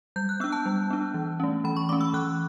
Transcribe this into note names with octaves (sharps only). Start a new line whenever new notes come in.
G3 G6
F#6
B3 D4 E6
A5
G3
B3 D4
E3
A3 C#4
E3 B5
C#6
A3 C#4 D6
E6
E3 F#6